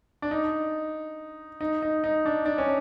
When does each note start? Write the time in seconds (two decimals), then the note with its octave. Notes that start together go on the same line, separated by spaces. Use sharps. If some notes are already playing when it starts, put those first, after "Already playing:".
0.22 D4
0.31 D#4
1.61 D#4
1.82 D#4
2.04 D#4
2.26 D4
2.46 D4
2.58 C#4